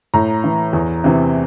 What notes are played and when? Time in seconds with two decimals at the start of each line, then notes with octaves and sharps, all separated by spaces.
0.14 A2 A#5
0.44 E3
0.73 E2
1.04 C3 E3